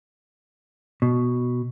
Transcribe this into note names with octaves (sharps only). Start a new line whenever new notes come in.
B2